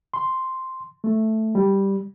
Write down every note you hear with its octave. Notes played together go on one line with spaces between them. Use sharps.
C6
A3
G3